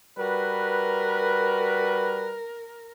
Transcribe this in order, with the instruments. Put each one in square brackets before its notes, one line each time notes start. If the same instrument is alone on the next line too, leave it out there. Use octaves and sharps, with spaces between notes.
[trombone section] G3 F#4 B4 [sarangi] A#4